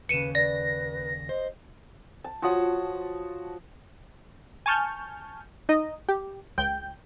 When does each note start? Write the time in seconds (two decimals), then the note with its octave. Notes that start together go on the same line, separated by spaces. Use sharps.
0.09 D#2 C#3 B4 C#7 D#7 E7
0.35 B4 D5 A#6
1.29 C5 D#5
2.24 A5
2.42 F3 F#4 C#5 F#5 A5 D#6
4.66 G#5 A5 C#6 F6 G6
5.69 D#4 D#5
6.09 G4
6.58 C#2 G5 G6